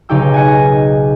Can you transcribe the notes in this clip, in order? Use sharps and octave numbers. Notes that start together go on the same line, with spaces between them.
B1 C#3 D#4 G4 G5 E6
D#5 F#5 G#5